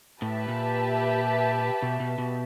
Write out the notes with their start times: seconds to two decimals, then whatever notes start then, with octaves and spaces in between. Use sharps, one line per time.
0.22 A2 G4 B4 E5 A5
0.48 A#2
1.82 B2
2.00 B2
2.18 B2